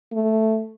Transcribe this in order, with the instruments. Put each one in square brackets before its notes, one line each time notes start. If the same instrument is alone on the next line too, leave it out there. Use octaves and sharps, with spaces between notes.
[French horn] A3